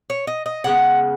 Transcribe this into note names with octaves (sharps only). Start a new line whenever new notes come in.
C#5
D#5
D#5
C#3 G#3 B3 F#5